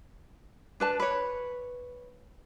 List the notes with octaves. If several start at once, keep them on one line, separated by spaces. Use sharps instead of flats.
D4 B4 A5
B4 C#5